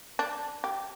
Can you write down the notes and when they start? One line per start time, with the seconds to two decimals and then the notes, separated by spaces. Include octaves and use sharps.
0.19 D4
0.64 G4